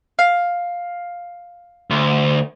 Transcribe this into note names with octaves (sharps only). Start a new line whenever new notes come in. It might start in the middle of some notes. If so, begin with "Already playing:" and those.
F5
D2